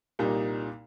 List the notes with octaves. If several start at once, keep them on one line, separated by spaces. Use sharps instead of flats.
C2 A#2 G3 A#3 D#4